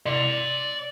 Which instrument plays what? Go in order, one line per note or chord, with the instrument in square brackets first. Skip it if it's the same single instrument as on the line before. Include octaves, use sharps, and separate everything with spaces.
[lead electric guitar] D5 C6